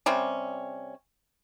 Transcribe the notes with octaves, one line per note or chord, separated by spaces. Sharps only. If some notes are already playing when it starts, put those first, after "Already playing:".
C3 G3 C4 C#4